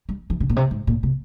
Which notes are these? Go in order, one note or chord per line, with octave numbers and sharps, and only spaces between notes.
G3
E3
C#3
A#2
C3
G#2
A#2
C3